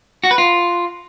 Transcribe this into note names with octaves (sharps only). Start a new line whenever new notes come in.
F#4
B4
F4